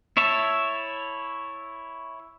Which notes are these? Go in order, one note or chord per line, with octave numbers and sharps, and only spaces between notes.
E4 C#5 E5 A5